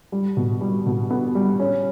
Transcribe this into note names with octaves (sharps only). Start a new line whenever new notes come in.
G3
B2
G3
B2
B3
G3
C#4